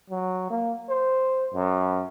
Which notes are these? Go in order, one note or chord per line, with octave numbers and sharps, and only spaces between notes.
F#3
A#3
C5
F#2